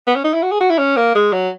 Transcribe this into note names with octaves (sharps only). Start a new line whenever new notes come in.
B3
C#4
D#4
E4
F#4
G#4
F#4
E4
C#4
A#3
G#3
F#3